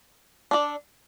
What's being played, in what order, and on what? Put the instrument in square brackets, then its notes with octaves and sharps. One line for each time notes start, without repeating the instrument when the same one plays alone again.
[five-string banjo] D4 A4 D5